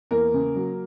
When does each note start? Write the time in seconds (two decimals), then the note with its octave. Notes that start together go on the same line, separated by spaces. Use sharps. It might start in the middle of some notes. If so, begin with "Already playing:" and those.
0.11 E2 A#3 A#4
0.34 C#3
0.56 F#3